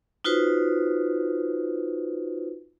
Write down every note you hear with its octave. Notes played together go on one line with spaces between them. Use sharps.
D#4 F4 F#4 B4 C5